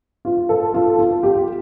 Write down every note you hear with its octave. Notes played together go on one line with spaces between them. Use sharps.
F4
A4
F4
F4
G4